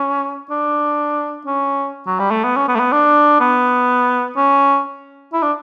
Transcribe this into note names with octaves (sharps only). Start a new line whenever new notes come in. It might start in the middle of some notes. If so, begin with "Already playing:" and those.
Already playing: C#4
D4
C#4
F#3
G3
A3
B3
C#4
B3
A3
B3
D4
B3
C#4
E4
D4